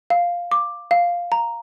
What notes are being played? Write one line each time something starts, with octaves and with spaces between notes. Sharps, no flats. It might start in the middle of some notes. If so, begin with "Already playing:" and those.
F5
D6
F5
A#5